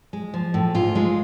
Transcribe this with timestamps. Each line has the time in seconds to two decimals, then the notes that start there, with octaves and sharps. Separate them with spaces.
0.13 G#3
0.34 F3
0.54 A2
0.75 G#2 F4
0.95 G#3